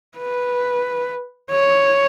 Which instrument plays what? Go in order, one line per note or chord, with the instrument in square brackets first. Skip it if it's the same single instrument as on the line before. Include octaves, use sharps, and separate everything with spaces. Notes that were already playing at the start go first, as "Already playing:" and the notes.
[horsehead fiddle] B4
C#5